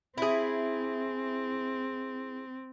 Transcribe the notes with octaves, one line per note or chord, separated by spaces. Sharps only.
C4 E4 G#4